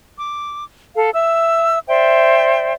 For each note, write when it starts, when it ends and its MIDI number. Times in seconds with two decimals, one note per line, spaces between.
0.17 0.65 86
0.95 1.09 69
0.95 1.09 77
1.14 1.79 76
1.14 1.79 88
1.88 2.74 72
1.88 2.74 74
1.88 2.74 76
1.88 2.74 79